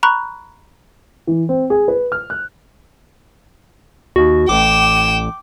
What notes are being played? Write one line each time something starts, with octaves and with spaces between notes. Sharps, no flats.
A#5 B5 C#6 F#6
E3
C4
G#4
B4
F6
F#6
D#2 F#4
A1 G5 D6 E7